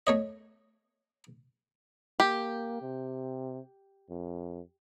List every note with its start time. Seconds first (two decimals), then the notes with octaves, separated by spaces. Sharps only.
0.07 A3 C#5 D#5
2.20 A#3 G4
2.82 C3
4.10 F2